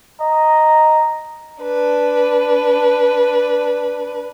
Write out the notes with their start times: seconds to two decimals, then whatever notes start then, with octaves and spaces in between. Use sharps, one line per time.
0.21 D#5 A#5
1.63 D4 B4